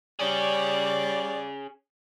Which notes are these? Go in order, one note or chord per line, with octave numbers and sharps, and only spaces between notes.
G3 C#4 G#4 C#5 D5